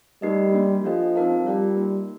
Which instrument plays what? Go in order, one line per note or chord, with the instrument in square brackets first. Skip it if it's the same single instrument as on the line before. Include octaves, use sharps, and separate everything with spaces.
[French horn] G3 [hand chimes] A3 D#4 G4 A#4 D#5
[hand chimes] A#3 D4 G4 A#4
[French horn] F3 [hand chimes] D4 F4 A4 D#5 G5
[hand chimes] C4 D#4 A#4 F5 A5
[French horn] G3 [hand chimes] F4 A#4 D5 G5
[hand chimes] A#3 D#4 A#4